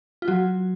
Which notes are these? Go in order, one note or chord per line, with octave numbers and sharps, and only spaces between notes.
F4
F#3 F#4